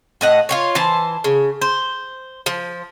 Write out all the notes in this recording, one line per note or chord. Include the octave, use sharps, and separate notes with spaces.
A2 D#5 F#5
F4 G4 C#5
E3 C5 A5
C#3
C5
F3